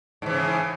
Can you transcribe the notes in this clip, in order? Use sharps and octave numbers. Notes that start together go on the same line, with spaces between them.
G#2 C#3 E3